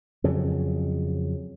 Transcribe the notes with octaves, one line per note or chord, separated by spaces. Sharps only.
F2 C#3 F#3